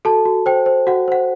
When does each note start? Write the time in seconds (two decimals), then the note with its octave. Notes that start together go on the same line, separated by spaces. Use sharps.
0.05 F#4 A4 A5
0.25 F#4
0.46 C5 G5
0.66 C5
0.87 F#4 F#5
1.08 C5 F#5